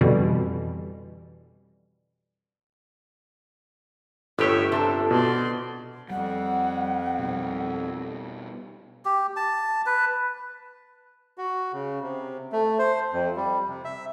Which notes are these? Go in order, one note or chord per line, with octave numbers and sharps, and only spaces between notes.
F2 B2 D3 E3 G3
G1 A2 A3 G4 C#5 E5
C3 D4 A4 A5
B2 D5 C6
F2 G3 F#5
B2 G3
G4
A5
B4
F#4
C#3
C3
A3
C5
F2
G3
C3
E5